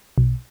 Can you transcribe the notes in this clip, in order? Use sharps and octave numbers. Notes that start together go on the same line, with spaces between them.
B1